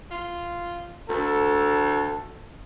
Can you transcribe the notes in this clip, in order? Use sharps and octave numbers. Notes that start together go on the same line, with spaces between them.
F4
D2 A4